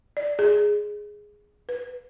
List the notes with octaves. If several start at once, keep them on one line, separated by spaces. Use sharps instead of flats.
D5
G#4
B4